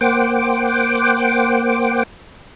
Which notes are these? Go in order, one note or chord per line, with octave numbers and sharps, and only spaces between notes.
A#3 C5 F#5 G5 D6